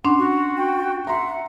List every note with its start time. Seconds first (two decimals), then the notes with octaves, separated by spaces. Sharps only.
0.05 C#4 D4 F#5 C6
0.19 F#4 C#6
0.57 G5
1.07 E5 F#5 A#5 C6